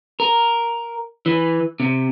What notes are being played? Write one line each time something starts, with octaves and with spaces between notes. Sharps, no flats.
A#4
E3
C3